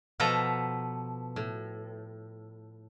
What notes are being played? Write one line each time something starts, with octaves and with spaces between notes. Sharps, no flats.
B2 F3 A4 B4 A#5
A2